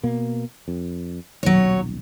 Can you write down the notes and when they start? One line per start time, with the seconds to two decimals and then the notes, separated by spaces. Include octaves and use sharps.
0.03 B2 A#3
0.68 F2
1.43 D#1 B1 F#3 C#5